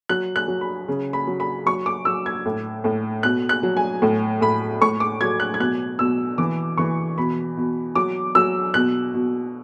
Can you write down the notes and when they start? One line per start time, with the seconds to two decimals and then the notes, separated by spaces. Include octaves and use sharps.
0.09 F#3 F#6
0.36 F#6
0.48 F#3
0.61 B5
0.88 C#3
1.13 B5
1.27 F#3
1.40 B5
1.66 F#3 C#6
1.86 D6
2.05 F#3 E6
2.26 G#6
2.46 A2
2.84 A2
3.23 B2 F#6
3.49 F#6
3.63 F#3
3.77 G#5
4.02 A2
4.41 A2 B5
4.81 A2 C#6
5.00 D6
5.21 F#3 G#6
5.40 F#6
5.54 G#6
5.59 B2 F#6
5.99 B2 E6
6.38 E3 D6
6.78 E3 C#6
7.18 B2 B5
7.57 B2
7.95 F#3 D6
8.35 F#3 E6
8.74 B2 F#6
9.14 B2